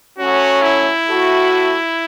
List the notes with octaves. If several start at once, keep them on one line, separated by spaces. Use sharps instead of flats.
F#3 A3 C#4 F#4
E4
A2 A3 F#4